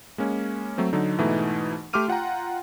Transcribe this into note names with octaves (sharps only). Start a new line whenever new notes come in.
G#3 A#3 C#4
F#3 A3 C4
D3 F#3 D#4
G#2 B2 E3 A3 D#4
A3 G4 C6 D6 F6 D#7
F4 F#5 G5 A#5